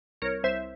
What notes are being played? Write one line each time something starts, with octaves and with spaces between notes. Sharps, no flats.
C2 A#4 C#5
C2 C5 E5